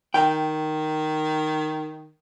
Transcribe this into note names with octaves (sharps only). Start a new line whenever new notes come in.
D#3 G5